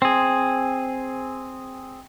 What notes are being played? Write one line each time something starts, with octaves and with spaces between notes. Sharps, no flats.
C4 G#4